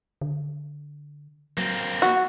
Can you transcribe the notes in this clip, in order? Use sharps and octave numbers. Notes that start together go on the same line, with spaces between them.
D3
F#3 A#3 C4
F#4